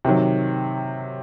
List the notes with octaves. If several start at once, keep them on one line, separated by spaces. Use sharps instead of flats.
C3 D#3 F#3